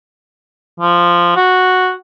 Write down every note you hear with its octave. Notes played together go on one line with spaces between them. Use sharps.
F3
F#4